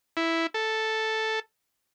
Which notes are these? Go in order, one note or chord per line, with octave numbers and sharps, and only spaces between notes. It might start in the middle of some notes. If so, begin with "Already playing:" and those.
E4
A4